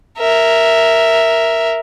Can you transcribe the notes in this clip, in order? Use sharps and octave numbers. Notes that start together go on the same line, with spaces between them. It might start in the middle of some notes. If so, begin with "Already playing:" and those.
A#4 E5